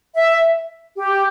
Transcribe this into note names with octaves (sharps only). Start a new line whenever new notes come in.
E5
G4